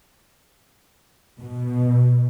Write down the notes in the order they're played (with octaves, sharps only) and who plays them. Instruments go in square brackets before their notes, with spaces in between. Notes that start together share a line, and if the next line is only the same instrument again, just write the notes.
[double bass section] B2